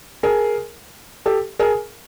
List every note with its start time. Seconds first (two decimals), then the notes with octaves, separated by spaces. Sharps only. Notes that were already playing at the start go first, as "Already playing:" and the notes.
0.23 G#4 A#4
1.26 G4 A4
1.59 G#4 A#4